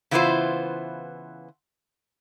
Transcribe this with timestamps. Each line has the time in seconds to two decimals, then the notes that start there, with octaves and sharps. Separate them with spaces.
0.11 C#3 E3 B3 E4 F4 C5